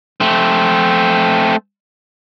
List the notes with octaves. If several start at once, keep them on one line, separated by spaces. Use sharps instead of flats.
A3 C4